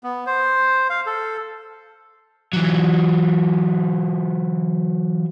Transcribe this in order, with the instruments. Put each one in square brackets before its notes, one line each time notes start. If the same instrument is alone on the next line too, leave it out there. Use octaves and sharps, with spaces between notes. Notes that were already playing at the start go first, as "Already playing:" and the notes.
[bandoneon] B3
C5
F5
A4
[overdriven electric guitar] E3 F#3